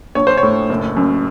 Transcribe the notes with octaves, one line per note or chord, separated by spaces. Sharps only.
A#1 C#5
C5
C#5
A2
F#1
F#2